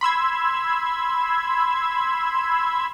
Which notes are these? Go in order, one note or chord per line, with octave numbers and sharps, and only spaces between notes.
B5 C6 E6 G#6